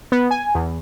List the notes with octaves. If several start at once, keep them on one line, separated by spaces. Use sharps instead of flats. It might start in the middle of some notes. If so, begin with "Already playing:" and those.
B3
G#5
E2